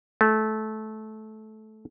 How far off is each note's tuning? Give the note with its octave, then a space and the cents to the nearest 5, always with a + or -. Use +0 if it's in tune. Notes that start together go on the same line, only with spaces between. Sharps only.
A3 -20